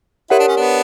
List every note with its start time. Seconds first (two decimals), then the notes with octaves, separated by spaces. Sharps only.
0.30 E4 G4 A#4 C#5 F#5
0.40 D4
0.48 C#4
0.57 B3 D4